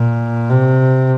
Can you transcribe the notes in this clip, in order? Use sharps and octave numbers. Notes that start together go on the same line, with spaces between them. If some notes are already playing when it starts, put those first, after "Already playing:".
Already playing: A#2
C3